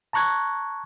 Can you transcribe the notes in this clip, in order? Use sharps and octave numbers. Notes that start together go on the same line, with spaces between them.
A5 A#5 C#6 F#6 G#6